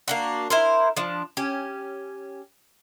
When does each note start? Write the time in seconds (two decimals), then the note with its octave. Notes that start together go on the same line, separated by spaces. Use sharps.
0.08 A#3 D4 F#4
0.50 E4 A#4 C5
0.97 F3 D4
1.37 C#4 G4